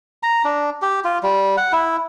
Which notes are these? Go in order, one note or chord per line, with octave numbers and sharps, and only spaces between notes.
A#5
D4
G4
F4
G3
F#5
E4